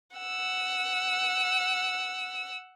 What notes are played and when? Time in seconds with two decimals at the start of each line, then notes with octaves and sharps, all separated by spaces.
0.17 F#5 E6